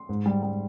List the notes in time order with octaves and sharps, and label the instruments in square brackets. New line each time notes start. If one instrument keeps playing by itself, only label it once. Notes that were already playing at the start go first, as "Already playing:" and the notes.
Already playing: [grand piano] C6
G#2
G3
G3